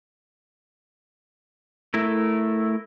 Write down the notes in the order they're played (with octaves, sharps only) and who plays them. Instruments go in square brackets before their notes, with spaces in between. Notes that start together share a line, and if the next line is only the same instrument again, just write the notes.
[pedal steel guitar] A3 E4 A#4